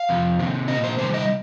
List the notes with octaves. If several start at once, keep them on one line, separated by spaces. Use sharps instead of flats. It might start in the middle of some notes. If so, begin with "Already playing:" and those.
Already playing: F5
F2 C3 F3
C3 D#3 C4
A#2 A#3 D#5
C5
C3 D#3 G3 C5
D#5